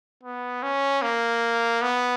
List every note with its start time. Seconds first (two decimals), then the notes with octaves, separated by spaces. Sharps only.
0.23 B3
0.63 C#4
1.02 A#3
1.82 B3